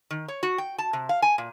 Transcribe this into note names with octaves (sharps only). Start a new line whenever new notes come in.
D#3
C#5
F#4
G5
A5
C3
F5
G#5
A#2